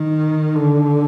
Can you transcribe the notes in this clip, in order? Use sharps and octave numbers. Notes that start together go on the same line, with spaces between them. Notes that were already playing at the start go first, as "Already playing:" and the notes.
Already playing: D#3
D3